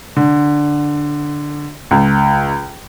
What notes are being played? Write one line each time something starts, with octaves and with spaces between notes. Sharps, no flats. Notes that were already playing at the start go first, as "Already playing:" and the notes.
D3
C#2